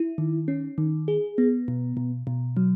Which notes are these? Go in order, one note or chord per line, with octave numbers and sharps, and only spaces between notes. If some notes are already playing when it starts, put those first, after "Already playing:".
Already playing: E4
D#3
C#4
D#3
G#4
B3
B2
B2
B2
F#3